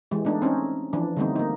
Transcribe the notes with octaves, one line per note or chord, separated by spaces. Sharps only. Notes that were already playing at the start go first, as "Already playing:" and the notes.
E3 G#3 G4
A3 B3 D4 D#4
C4 C#4 D#4
E3 F3 D4
D3 G3 A3 B3 C4 D#4
A#3 D#4